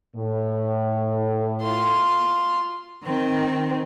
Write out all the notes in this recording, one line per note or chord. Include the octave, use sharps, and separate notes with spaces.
A2
F4 C6
D#3 C4